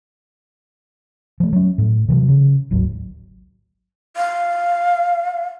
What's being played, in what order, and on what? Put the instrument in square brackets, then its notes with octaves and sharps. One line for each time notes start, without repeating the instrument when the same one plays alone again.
[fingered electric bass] F3 A3
F#3 C#4
A2
C3 E3 F#3
C#3
D1 G#1 F#3
[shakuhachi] F5